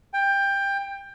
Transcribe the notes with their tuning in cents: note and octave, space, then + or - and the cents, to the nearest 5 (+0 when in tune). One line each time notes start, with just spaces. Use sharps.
G5 +15